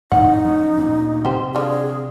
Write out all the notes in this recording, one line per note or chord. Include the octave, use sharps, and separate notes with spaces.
F2 A2 D#3 D#4 F#5
F3 C#4
D2 A#2
C3 G4 C5
D3 F3 G#4